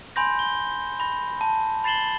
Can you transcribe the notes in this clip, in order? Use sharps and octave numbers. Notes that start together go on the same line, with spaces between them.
G#5 B5 C6 G6 A#6
G7
B5 A#6
A5
B5 A6 C7 E7 F#7 G7